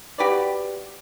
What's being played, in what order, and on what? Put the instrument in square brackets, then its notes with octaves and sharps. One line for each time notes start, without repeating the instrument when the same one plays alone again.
[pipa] F#4 G4 B4 D5